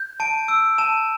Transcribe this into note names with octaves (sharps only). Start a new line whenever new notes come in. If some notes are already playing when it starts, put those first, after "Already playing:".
Already playing: G6
A5 D7
E6 D7
A5 E7